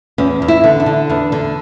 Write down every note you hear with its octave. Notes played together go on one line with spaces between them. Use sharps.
E2 C#4
E2
E4
D3
D4
D3
E2 D4
D3